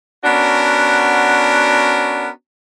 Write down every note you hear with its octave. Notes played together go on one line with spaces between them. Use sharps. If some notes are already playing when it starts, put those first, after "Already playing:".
B3 C#4 D4 F#4 A#4